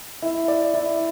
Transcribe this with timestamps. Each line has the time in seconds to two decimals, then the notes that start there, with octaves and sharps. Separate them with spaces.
0.22 E4
0.48 D5
0.74 E4